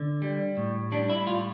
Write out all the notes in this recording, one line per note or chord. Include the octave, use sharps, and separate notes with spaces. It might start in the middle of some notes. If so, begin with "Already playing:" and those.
Already playing: D3
G3
A2
G3 D4
E4
A2 F4